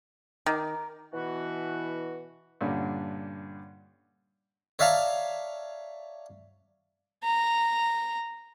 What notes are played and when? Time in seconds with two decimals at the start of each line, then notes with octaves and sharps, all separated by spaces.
0.46 D#3 A#4 D6
1.14 B2 E3 F#4
2.61 G2 A#2 D3 C#4 D4
4.79 C#5 D5 E5 F5 A5 A#5
7.24 A#5